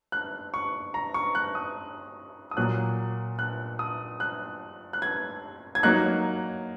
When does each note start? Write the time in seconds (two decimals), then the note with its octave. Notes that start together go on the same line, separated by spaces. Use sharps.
0.12 F#6
0.54 C#6
0.94 A#5
1.14 C#6
1.35 F#6
1.55 D#6
2.51 D#6
2.57 A#2 F#3 A#3 F#6
3.39 F#6
3.79 D#6
4.20 F#6
4.93 F#6
5.02 G#6
5.75 G#6
5.83 F#3 A#3 D#4 F#6